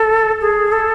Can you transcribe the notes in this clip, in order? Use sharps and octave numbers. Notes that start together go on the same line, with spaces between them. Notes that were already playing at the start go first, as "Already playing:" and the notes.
Already playing: A4
G#4
A4